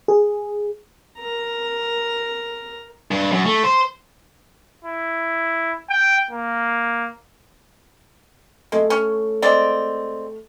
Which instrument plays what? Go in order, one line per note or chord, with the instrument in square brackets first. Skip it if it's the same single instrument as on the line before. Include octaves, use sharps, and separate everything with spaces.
[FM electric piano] G#4
[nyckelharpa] A#4 A#5
[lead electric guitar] G2
F#2
A3
C5
[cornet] E4
G5
A#3
[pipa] G#3 [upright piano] A3
[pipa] C#4
G#3 C4 D5